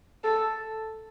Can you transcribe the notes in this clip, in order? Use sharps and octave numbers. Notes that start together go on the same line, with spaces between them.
A4